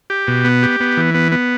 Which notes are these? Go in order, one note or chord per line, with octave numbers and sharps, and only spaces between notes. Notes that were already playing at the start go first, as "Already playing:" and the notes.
G4
B2
B3
G4
B3
E3
B3
B3